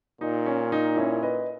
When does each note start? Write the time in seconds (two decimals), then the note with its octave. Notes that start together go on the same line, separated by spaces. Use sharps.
0.21 A#2 D#4
0.46 C#4
0.72 D#4
0.97 C#4 E4
1.23 B4 D#5